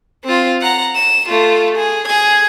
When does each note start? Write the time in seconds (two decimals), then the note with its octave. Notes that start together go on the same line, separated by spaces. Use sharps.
0.24 C4 F4
0.61 F#5 A#5
0.95 E7
1.29 A3 F4
1.77 G#4
2.08 G#4 G#6